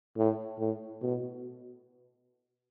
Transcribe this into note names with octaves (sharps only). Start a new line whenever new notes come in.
A2
A2
B2